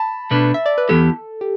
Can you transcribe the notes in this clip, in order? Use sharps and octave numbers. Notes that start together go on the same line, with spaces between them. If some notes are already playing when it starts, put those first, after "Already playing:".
Already playing: A5 B5
B2 A3 D4 B4
E5
D5
B4
E2 E3 B3 E4 G4 A4
G4